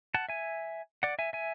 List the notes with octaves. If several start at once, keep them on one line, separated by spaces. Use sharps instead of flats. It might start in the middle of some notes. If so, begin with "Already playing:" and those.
F#5 A5
E5 G#5
D5 F#5
E5 G#5
E5 G#5